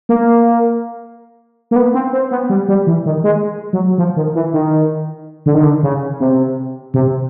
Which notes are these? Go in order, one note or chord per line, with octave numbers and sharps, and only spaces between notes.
A#3
A#3
B3
C4
C4
B3
G3
G3
E3
D#3
G#3
F#3
F3
D#3
E3
D#3
D3
D#3
D3
C#3
C3
C3